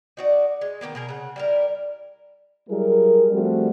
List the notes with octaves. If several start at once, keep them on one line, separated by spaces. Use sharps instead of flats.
D#4 F#4 D5
G#3
D#3 E3 A#3 B3
B2 G#4 A#4
C#3 F#5
G3 E4 A#4
F#3 G3 E4 G#4 A#4
F3 G3 A3 C4 F#4 A4